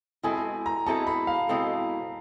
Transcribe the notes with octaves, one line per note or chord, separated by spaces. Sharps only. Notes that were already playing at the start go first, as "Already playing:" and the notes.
B2 G#3 C4 E4 A4 G#5
A#5
B2 G#3 C4 E4 A4 A5
B5
F5
B2 G#3 C4 E4 A4